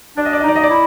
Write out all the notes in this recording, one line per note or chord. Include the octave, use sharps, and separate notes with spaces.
D4 D5
D#5
D5
D#5
D#4 D5
D#5
D5
E4